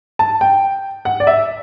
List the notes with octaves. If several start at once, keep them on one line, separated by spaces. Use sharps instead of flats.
A5
G5
F#5
D5
E5